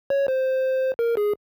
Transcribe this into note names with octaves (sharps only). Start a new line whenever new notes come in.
C#5
C5
A#4
G#4